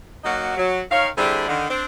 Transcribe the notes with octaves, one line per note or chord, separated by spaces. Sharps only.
F#3 A#3 D#4 F#4
F#3
D#3 C#5 F5
D3 G3 C4 D4 E4 G#4
D3 D#3
C4 D4